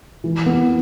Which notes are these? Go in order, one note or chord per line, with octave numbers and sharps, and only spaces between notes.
E3
B3